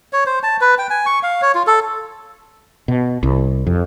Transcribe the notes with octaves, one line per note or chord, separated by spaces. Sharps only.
C#5
C5
A5
B4
G5
G#5
C#6
F5
C#5
F4
A4
B2
C2
F2